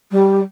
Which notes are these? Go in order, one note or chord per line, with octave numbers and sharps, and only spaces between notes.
G3